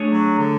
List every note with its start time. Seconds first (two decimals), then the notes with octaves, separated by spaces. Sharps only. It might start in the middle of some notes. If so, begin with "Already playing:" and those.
Already playing: A3 D4 G#4 C#5
0.11 F#3
0.39 D3